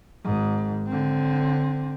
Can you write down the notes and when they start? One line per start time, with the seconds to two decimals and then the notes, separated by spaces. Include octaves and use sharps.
0.24 G#1 G#2
0.87 D3 C4